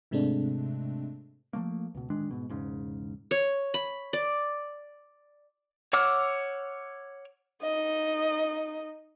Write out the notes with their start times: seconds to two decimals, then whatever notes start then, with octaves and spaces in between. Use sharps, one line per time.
0.11 G#2 C3 G#3 A3 C4 D4
1.53 F3 F#3 A3 A#3
1.95 C#2 B2
2.10 D1 D#3 G#3 D4
2.31 G#2 B2
2.49 E1 G#2 C#3
3.31 C#5
3.74 B5
4.13 D5
5.93 C#5 F#5 D6 E6 F6
7.62 D#4 D#5